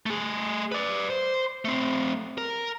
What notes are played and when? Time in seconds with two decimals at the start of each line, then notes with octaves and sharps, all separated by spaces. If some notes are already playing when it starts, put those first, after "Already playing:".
0.06 A3 G#4
0.72 B4 D5
1.10 C5
1.65 A3 C4
2.38 A#4